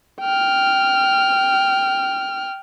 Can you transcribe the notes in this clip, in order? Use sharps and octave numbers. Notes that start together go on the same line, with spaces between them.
G5 F6